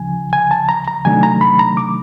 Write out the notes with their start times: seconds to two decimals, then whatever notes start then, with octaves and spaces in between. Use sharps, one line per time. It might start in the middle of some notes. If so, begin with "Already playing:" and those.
Already playing: D2 C#3 F3 G#5
0.33 G#5
0.51 A5
0.69 A#5
0.88 A#5
1.05 C3 D#3 F#3 A3 D4 G#5
1.23 A#5
1.41 B5
1.59 A#5
1.77 D6